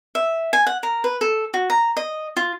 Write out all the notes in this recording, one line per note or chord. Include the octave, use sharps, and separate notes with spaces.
E5
G#5
F#5
A#4
B4
A4
F#4
A#5
D#5
F4